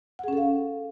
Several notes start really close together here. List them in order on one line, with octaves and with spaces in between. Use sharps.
F#5 G#4 C#4 A4 F5